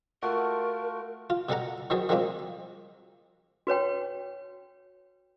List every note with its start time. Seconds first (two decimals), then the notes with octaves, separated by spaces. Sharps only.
0.23 A3 F4 F#4 A#4
1.30 F4
1.49 B2 G3 A4 F#5 A#5
1.90 D#3 E3 F#3 G#4 C5 C#5
2.09 D#3 F3 G3 G#3 A#3 C4
3.67 F#4 B4 C#5 G5